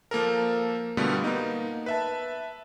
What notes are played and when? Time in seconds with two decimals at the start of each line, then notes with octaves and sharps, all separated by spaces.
0.11 F3 A#3 A4 A#4
0.97 B2 D3 G3 A3 B3 F4
1.24 A#3 B3 D#4
1.86 B4 E5 A5